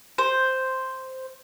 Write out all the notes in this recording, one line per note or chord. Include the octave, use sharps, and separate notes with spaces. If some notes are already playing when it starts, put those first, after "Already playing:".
C5